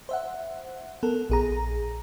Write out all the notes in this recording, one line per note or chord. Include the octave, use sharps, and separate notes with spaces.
C5 E5 F#5
B3 A4 A#4
A#1 G#4 A#5